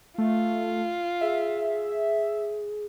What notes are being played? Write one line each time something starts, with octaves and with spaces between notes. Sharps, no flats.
A3 F4
G#4 E5